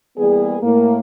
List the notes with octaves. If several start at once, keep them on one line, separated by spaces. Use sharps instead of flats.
E3 G3 A#3 B3 G#4
A2 A#3